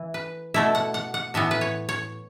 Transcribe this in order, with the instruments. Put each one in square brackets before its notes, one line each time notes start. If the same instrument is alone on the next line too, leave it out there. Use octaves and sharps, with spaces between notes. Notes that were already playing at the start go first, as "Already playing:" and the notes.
Already playing: [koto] E3 E4
B4
B2 A3 E4 E5
F#5
F#5
F#5
A2 E3 B3 E5
B4
C#5
C#5